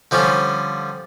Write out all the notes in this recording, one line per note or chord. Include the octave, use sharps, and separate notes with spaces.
D3 F3 G3 C#4